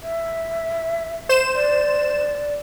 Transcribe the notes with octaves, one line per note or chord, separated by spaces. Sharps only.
E5
C5 E7
D5